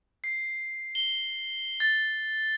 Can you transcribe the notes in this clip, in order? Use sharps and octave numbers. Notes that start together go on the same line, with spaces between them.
C7
G7
A6